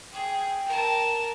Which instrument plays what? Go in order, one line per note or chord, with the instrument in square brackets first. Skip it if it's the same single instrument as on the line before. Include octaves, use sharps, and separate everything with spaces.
[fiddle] G#4 [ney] G5
[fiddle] A#4 A5